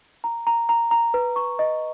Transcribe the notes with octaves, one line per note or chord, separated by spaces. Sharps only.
A#5
A#5
A#5
A#5
B4
C#6
D#5